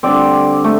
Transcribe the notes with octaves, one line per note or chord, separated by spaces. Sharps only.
D3 G3 C4 D5
A3